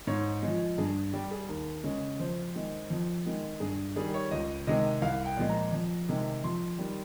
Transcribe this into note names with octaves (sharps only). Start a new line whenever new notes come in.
G#2 C#5
F3 G#3
G2 G#4
G3 G4
G#4
D#2 A#4
C#3 G#3
F2 C5
D#3 G#3
F2
D#3 G#3
G2 G#4
D#3 G3 G#4
C#5
C#2 D#5
C3 D#3 G#3 D#5
C2 F5
G5
A#2 F3 G#3
A#5
F2
C3 D#3 G#3
F2 C6
D#3 G3